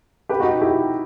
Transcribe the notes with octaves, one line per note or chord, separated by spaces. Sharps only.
G4 B4
D#4 F#4
E4 G4